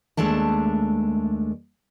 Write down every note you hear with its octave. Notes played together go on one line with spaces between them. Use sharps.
D#2 G#3 A3 D4 A5